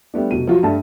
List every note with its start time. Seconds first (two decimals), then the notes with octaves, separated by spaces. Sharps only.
0.14 G3 A3 B3 D4
0.31 F1 B2 D#7
0.47 F3 F#3 F4 F#4
0.63 G2 G3 A3 A5